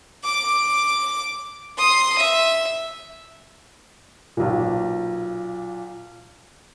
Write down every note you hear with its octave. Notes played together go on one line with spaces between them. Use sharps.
D6
C6 D#6
E5
B1 A#2